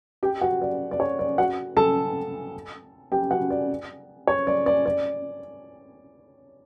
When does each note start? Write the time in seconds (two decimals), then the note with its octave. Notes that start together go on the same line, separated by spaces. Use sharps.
0.23 G4 G5
0.41 F#4 F#5
0.62 D5
0.91 D5
1.00 C#5
1.19 D5
1.38 F#4 F#5
1.77 A4 A5
3.12 G4 G5
3.31 F#4 F#5
3.51 D5
4.27 C#5
4.47 D5
4.66 D5
4.86 D5